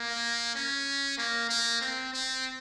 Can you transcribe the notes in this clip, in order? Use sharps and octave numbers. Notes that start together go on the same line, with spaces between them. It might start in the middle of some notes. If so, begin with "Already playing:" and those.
Already playing: A#3
C#4
A#3
A#3
C4
C4